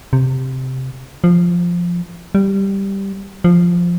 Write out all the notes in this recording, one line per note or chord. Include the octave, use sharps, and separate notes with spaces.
C3
F3
G3
F3